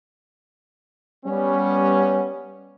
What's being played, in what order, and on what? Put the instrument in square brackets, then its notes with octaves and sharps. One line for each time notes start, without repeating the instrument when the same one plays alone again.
[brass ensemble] G3 B3 C#4